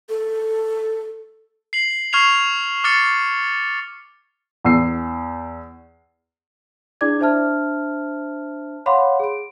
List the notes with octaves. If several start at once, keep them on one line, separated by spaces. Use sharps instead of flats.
A4
C7 F#7
C#6 F6 G#6 C7 F7 F#7
D6 F6 A6 C#7
E2 E6 C7
D4 E4 G#4 D5 D6 G#6
D4 C5 E5 A5 F6
C#5 F5 F#5 B5 C6 D6
G#4 D7